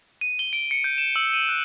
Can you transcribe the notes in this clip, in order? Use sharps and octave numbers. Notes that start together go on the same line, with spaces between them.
D#7
G7
D7
C#7
G6
E7
E6
D#7
F#6